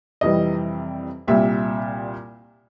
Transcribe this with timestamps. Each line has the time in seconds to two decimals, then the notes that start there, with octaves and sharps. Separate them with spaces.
0.21 F2 C3 E3 G3 D#5
1.27 C2 A#2 G3 E5